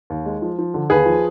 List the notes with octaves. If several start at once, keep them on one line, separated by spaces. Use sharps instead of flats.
D#2
G#3
F3
F3
D3
D#2 G#4 B4
F3